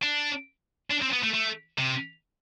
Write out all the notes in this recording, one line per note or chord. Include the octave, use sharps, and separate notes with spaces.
D4
D4
C4
B3
A3
A3
C3